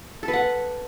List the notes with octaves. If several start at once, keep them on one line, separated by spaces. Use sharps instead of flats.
A4
B4
F#5